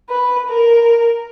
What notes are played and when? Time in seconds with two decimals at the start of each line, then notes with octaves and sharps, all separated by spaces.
0.09 B4
0.48 A#4